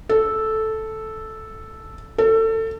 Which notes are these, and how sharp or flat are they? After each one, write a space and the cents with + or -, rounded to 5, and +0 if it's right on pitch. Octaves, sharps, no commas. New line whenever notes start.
A4 -5
A4 +25